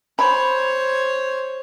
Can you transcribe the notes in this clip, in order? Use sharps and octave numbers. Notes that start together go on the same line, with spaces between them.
C5 C#5 B5